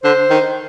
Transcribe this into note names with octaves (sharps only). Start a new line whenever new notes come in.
D3 C5
D#3